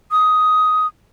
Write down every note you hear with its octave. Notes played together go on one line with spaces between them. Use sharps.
D#6